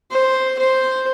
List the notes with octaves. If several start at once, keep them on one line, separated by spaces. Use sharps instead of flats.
C5
C5